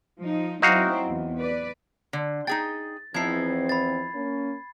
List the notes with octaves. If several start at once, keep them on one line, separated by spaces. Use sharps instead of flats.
F3 D#4
F#3 C4 D#4 E4 F#4 F5
E2
B4 D5
D3
D#4 G#4 G5 A6
E2 F3 C4 D#4 E4 G#6 C7
B5 A6
A#3 C#4